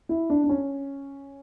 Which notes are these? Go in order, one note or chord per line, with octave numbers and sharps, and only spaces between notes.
E4
D4
D4
C#4